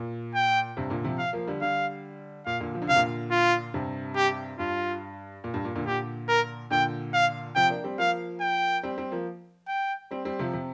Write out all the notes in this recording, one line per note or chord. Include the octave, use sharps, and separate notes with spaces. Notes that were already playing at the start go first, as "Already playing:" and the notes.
Already playing: A#2
G5
G2 C3
A#2 D3
C3 F3
F5
F3 A#3
D3 G3
D3 G3 F5
A#2 F5
A#2 D3
F3
D3
C3 F5
A#2 D3
F4
G2 C3
G4
G2 F4
A#2
G2
A#2
A#2 D3
A#2 D3 G4
A#4
A#2 D3 G5
F5
C3 F3 G5
A#3 D4
G3 C4
F3 A#3 F5
G5
G3 C4
G3 C4
F3 A#3
G5
G3 C4
G3 C4
C3 F3
C3